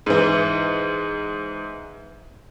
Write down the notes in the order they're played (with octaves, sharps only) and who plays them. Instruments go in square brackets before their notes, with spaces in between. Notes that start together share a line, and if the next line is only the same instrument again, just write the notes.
[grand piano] G#2 E3